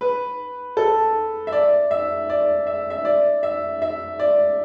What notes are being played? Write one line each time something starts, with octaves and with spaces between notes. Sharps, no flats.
B4
A4
E5
D5
E5
D5
E5
E5
D5
E5
E5
D5